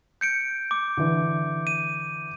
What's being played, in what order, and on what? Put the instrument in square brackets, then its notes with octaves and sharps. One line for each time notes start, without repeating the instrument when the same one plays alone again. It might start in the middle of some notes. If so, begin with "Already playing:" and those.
[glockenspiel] G6 C#7 D7
D6
[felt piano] D3 E3
[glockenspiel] D#7